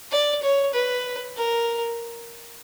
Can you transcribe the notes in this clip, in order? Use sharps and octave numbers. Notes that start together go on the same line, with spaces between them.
D5
C#5
B4
A#4